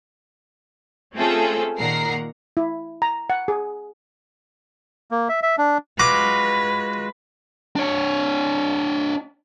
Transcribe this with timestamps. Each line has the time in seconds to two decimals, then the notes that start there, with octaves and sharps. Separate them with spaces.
1.15 A3 C4 C#4 F4 G#4 A4
1.78 A#2 D#3 A#4 F#5 A#5 C7
2.57 E4
3.02 A#5
3.30 F#5
3.48 G#4
5.11 A#3
5.29 E5
5.43 E5
5.58 D4
6.00 G#3 F4 F#4 B4 D6
7.76 D4 C#5